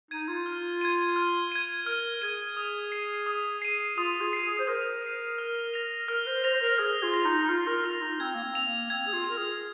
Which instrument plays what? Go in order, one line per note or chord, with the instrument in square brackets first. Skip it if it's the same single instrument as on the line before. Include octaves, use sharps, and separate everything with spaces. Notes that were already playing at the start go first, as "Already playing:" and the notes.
[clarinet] D#4 [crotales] G#6 D#7
[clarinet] F4
[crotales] F6
G#6 D#7
F6
G#6 D#7
[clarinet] A#4 [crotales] F6
[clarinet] G#4 [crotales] G#6 D#7
[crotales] D#6
C7 D#7
D#6
C7 D#7
[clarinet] F4 [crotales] D#6
[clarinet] G#4
[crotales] C7 D#7
[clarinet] G#4
C5
[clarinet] A#4 [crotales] D#6
[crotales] C7 D#7
F6
A#6 F7
[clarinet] A#4 [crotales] F6
[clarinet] C5
[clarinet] C5 [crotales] A#6 F7
[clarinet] C5
A#4
[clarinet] G#4 [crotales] F6
[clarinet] F4
[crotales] A#6 F7
[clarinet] D#4
D#4
[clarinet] F4 [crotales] F6
[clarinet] A#4
[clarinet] F4 [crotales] A#6 F7
[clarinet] D#4
[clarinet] C4 [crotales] G#6
[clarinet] A#3
C4
[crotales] F7
[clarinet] A#3
[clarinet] C4 [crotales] G#6
[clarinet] G#4
F4
[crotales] F7
[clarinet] A#4
G#4